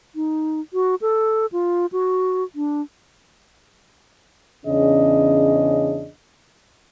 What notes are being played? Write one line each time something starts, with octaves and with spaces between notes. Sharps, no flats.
D#4
F#4
A4
F4
F#4
D4
E2 C#3 C#4 D4 G#4 D#5